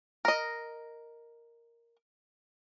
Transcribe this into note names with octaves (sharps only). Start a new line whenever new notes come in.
A#4 D#5